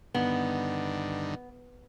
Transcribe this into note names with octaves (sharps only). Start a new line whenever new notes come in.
G2 D3 D#3 B3